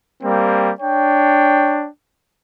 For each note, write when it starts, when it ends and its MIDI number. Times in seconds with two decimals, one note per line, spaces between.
0.23 0.72 55
0.23 0.72 58
0.23 0.72 60
0.81 1.87 62
0.81 1.87 73
0.81 1.87 79